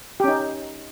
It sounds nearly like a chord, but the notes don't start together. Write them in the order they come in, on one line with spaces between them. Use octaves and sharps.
G4 C#4 D#4